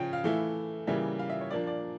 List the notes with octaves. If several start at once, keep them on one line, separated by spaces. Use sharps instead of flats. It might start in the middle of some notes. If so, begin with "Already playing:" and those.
Already playing: C#3 F3 C#4 G5
F5
E3 A3 E4
C#3 E3 G3 A#3 E5
F5
E5
C#5
A#2 F3 A#3 D4 D5
D5